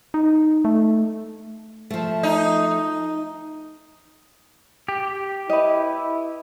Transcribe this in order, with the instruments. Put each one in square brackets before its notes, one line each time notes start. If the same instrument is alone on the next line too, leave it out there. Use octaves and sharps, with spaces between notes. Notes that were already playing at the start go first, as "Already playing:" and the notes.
[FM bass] D#4
A3
[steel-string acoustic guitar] F3 A3
[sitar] D#4
[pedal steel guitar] G4
[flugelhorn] E4 [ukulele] B4 D#5